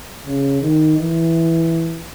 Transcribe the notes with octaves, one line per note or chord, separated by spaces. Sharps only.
C#3
D#3
E3